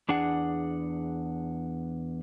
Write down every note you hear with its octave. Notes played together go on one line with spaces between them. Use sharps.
E2 D4 G#4 F#5